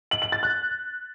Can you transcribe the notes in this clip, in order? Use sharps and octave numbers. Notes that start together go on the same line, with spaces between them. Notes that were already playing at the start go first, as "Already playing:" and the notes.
F#7
F#7
A6
F#6